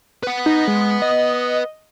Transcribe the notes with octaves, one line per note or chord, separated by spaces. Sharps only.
B4 F#5
D#4
G#3
D#5